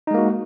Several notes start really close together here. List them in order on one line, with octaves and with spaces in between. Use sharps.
D#4 G#3 A#3 F#4